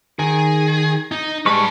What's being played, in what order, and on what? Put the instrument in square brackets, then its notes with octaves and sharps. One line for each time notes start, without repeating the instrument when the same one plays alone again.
[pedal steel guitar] D#3 [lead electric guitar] G#4
[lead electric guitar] D#4
[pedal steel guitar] G3 G#3 C#6 [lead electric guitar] B4 A5